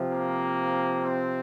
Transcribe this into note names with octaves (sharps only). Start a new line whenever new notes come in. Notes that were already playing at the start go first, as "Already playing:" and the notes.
Already playing: C3 F3
A#3
C4